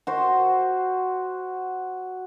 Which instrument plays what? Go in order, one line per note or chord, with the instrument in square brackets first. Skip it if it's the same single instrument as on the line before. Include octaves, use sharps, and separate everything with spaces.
[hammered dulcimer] F#4 C5